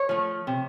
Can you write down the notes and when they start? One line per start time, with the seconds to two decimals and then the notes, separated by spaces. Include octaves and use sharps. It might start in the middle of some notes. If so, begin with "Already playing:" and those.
Already playing: C#5
0.09 F3 A3
0.47 C3